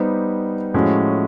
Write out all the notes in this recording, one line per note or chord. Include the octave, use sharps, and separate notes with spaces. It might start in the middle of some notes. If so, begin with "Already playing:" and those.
Already playing: G3 B3 D#4 G4 C5
A2 F3 G#3 C#4 F#4